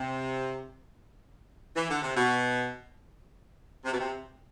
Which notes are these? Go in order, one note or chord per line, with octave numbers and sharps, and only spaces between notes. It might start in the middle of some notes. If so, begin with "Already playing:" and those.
Already playing: C3
E3
D3
C3
B2
C3
B2
C3